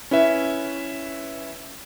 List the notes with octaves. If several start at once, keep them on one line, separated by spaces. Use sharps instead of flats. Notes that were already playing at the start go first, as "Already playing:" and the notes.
C#4 E4 B4 E5